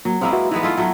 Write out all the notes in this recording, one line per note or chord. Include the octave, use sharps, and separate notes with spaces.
F#3 A#3
G#3 A#3 C4 E4 F5
F#4 B4 E5
E3 G#3 B3 D#4
A3 E4 F4
F#3 A3 F#4